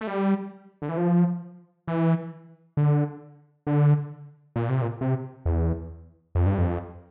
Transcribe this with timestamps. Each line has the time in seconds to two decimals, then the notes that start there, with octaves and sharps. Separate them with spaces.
0.01 A3
0.07 G3
0.82 D3
0.89 E3
0.97 F3
1.88 E3
2.77 D3
3.67 D3
4.56 A#2
4.69 C3
4.82 A#2
5.01 C3
5.46 E2
6.35 F2
6.46 G2
6.58 F2